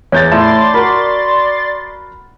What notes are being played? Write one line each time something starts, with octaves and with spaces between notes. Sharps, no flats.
E2 C#5 G6 A6
A2 D5 A5 C6 A6
F#4 A#4 B5